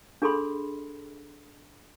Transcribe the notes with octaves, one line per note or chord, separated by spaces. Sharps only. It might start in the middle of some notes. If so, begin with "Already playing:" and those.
D4 G#4 A4 B5 C6